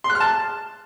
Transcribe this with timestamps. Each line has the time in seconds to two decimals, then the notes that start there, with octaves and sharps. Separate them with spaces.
0.04 C6
0.10 F#6
0.15 F6
0.20 A5